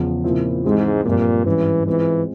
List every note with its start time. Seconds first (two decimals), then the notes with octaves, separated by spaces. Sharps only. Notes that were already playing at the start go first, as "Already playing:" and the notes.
Already playing: E2 C#3 F3
0.23 A#2 C#3 F3 C4 E4
0.64 G#2 E3 G#3 C4 G4
1.05 G2 A#2 F3 C4
1.46 G#2 E3 G3 C#4
1.87 E3 G#3 C4 F4 G#4